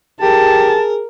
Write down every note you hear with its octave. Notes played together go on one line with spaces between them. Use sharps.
G4 G#4 A#4 A5